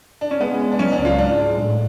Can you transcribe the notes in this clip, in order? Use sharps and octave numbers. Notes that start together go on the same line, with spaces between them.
D4
C#4
G#3 B3
G#3
D4
F#3 C#4
D4
C#2
F4
G#2 D4
G#3
A2